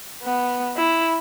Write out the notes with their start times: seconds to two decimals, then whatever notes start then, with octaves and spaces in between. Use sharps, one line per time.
0.23 B3
0.77 E4